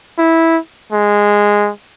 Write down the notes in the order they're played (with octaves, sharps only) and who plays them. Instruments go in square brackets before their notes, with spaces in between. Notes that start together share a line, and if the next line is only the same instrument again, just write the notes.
[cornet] E4
G#3